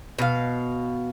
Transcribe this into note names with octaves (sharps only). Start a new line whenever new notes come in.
B2 F5